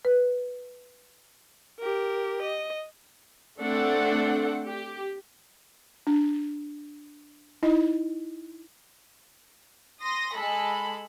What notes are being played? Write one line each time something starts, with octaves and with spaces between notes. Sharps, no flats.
B4
G4 A#4
D#5
A3 C4 D4 A4 F#5
G4
D4
D#4 E4 D#5
C6 D#6 A#6
G#3 A4 B5